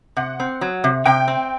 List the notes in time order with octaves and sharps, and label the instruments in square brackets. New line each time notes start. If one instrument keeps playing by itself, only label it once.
[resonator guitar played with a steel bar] C3 [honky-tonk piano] F#5
[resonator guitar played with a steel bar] C4
F#3
C3
[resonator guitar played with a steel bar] C3 [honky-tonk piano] G5
[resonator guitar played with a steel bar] C4